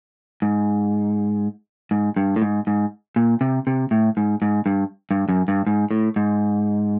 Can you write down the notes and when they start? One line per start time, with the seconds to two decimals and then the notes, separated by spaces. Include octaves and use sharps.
0.42 G#2
1.91 G#2
2.16 G2
2.36 A2
2.42 G#2
2.67 G#2
3.16 A#2
3.41 C3
3.67 C3
3.91 A2
4.17 G#2
4.42 G#2
4.66 G2
5.11 G2
5.29 F#2
5.48 G2
5.67 G#2
5.91 A2
6.16 G#2